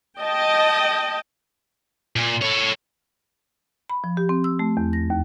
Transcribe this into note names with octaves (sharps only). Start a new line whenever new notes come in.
D#5 G5 A5
A#2
A4 C#5
B5
F3
G4
C4
E6
A3
E2
A#6
D#2